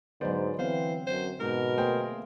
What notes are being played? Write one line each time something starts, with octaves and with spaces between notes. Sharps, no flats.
G#2 D3 F#3 B3 C5 D5
E3 B3 C4 C5 F5
F#2 C5
G#2 B2 A#4
A3 A#3 G#4 C5 G5